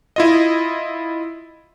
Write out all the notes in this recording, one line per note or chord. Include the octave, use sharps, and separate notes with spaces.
E4 F4 D#5